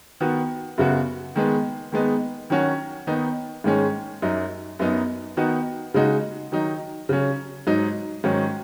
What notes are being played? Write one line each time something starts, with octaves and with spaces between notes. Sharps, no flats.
D#3 B3 F#4
F#2 C#3 B3 F#4
D#3 G#3 B3
D#3 G#3 B3 D#4
D#3 F#3 C#4 F#4
D#3 B3 D#4
G#2 D#3 G#3 C#4
F#2 F#3 D#4
F#2 F#3 B3 D#4
D#3 B3 D#4 F#4
C#3 G#3 D#4 F#4
D#3 F#3 D#4
C#3 F#3 C#4
G#2 F#3 D#4
G#2 D#3 F#3 C#4